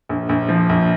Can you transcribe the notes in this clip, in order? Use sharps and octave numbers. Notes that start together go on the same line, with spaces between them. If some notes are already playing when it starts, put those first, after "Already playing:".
A#1
A#1
F3
A#1